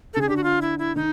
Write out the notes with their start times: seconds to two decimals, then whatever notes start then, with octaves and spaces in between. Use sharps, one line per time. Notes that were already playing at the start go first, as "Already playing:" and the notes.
0.14 A4
0.16 C#3
0.21 G#4
0.27 D3 G4
0.37 F#4
0.44 F4
0.61 E4
0.79 E4
0.96 D#3 D#4